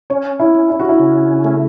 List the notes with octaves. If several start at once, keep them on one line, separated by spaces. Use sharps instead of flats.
C#4 C#5
E4
C#4
E4
F#4
E4
C#3
A3